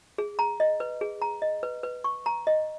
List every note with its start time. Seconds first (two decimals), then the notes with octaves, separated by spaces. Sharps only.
0.18 G#4
0.39 A#5
0.60 D#5
0.80 B4
1.01 G#4
1.22 A#5
1.42 D#5
1.63 B4
1.83 B4
2.04 C#6
2.26 A#5
2.47 D#5